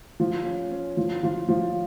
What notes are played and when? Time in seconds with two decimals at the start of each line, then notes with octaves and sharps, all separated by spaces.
0.20 F3
0.46 C#4
0.71 C#4
0.97 F3
1.23 F3
1.49 F3